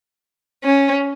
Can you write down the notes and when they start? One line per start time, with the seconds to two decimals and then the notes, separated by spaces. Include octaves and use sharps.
0.64 C#4